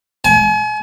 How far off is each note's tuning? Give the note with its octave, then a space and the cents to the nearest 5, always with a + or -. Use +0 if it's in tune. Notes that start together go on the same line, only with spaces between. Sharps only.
G#5 +40